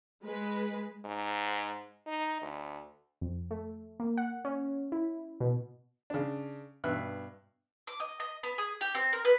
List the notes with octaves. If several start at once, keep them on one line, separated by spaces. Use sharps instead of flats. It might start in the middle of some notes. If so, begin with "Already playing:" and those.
G#3 B4
G#2
D#4
D2
F2
A3
A#3
F#5
C#4
E4
B2
C#3 D4
G2 B2 E5 F#6
D6
D#5
D#5
B3
G#4
G4
C4
A#4
B4